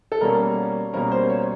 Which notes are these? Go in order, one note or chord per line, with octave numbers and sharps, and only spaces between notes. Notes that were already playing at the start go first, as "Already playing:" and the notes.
A4
B2 G3 A#3 C#4 A#4
B2 G3 A#3 C#4 A#4
C5
C#5